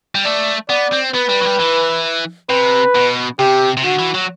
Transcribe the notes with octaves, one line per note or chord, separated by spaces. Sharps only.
G3
A3 D5
B3 D5
C4
B3 B4
G3
F#3
G3
E3
C3 B4
B2
C3 G4
C3
D3 F#4
E3
F#3